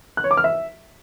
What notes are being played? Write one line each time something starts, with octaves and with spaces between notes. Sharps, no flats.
F#6
C#5
D6
F6
E5